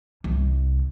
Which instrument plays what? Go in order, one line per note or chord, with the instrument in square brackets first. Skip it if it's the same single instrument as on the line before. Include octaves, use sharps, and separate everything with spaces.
[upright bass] C2